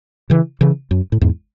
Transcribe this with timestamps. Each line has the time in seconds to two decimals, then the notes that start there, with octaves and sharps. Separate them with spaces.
0.30 C#3 E3
0.61 C#3 E3
0.91 F#2
1.12 A2
1.21 E2 G#2